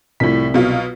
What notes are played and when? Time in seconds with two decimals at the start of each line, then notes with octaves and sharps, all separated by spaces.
0.20 C2 A2 F3 B6
0.54 B2 F#3 F4